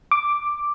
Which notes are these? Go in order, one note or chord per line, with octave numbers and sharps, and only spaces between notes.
D6